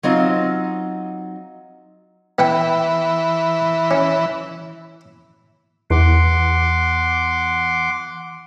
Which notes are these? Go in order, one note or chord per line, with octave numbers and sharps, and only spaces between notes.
F#3 C4 D#4 F4
E3 B3 F#5 G5
C#4
E2 F#5 C6 D6